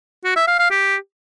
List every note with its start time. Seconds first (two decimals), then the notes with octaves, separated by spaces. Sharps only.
0.25 F#4
0.36 E5
0.48 F5
0.59 F5
0.70 G4